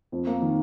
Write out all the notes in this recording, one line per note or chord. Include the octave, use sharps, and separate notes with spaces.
F2
A#3
D#3